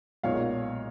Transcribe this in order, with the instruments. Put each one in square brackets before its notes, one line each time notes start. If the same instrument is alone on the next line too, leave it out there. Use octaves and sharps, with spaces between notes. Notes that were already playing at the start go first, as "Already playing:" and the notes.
[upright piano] B1 A#2 G#3 C#5 F5